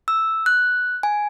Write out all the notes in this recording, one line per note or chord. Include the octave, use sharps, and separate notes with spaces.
E6
F#6
G#5